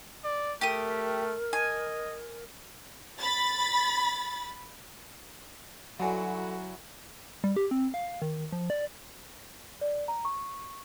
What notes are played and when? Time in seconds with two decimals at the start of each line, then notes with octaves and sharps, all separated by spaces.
0.24 D5
0.61 A3 G4 A#4 D#6
1.53 D#5 G#5
3.20 B5 A6
6.00 G2 D3 F#3 E4 F#4 F#5 G#5
7.44 G3
7.56 G4
7.71 C4
7.94 F5
8.22 D#3
8.52 F3
8.70 D5
9.81 D5
10.08 A#5
10.25 C#6